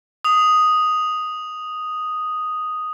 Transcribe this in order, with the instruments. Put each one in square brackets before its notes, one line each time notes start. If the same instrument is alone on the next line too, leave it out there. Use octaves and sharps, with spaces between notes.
[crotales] D#6 F7